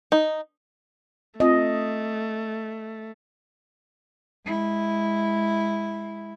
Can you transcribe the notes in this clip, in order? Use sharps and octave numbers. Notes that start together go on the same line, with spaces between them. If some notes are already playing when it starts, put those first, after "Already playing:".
D#4
A3 C4 F4 D#5
G#3 E4